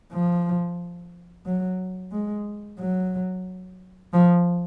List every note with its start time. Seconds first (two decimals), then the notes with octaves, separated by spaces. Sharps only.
0.12 F3
1.46 F#3
2.12 G#3
2.79 F#3
4.13 F3